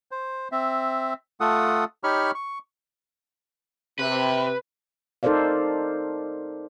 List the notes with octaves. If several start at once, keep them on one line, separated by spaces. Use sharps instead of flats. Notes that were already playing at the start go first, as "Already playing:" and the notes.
C5
C4 E5
A3 F4 A4 F#5 D#6
D#4 G4 C#5 B5 C#6 F6
C#6
C3 B4
D#4 A4 A#4 C5 D5 F5